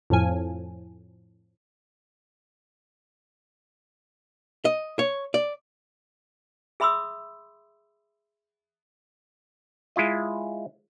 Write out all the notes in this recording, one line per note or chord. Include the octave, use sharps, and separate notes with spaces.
F2 A2 F3 G#5
D#5
C#5
D5
G#4 E5 B5 C6 D#6 E6
G#3 E4 F4 D#5